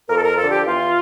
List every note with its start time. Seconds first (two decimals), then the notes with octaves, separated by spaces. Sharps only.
0.09 F2 A#4
0.17 A4
0.23 A#4
0.37 D3 F3 A4
0.50 G4
0.65 E2 F4